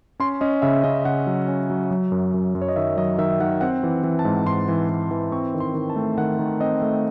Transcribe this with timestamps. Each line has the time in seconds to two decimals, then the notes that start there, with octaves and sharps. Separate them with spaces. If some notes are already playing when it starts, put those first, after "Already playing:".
0.20 C#4 C6
0.41 C#4 D#5
0.62 C#3 E5
0.84 C#3 D#5
1.05 C#3 F#5
1.27 F#3
1.48 C#4
1.70 F#3
1.91 F#3
2.12 F#2
2.34 F#2
2.55 F#2
2.62 C#5
2.69 D#5
2.76 D#3 E5
2.97 F#3 D#5
3.18 D#3 E5
3.40 D#3 F#5
3.61 C4 F#5
3.83 E3
4.04 E3
4.19 A5
4.25 G#2
4.47 G#2 C6
4.69 E3
4.89 E3
5.11 E3
5.32 C4 C#6
5.54 D#3
5.60 C6
5.74 D#3
5.90 A5
5.96 A3
6.18 D#3 F#5
6.39 D#3
6.61 C4 D#5
6.82 A3